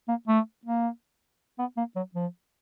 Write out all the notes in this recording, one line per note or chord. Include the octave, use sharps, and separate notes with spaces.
A#3
A3
A#3
B3
A#3
F#3
F3